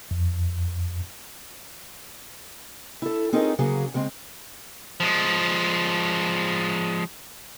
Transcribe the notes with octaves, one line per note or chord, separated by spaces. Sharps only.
F2
E4 A4
C4 C#4 D#4 F4 G#4 A#4
D2 C#3 F#3 A#3 G#4 F5
C#3 G#3 C4
F3 G#3